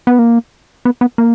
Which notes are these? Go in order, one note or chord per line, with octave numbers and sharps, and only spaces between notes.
B3
A#3
B3
B3
A#3